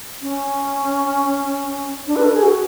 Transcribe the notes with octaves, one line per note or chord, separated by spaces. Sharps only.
C#4
D4
B4
A4
G#4
F#4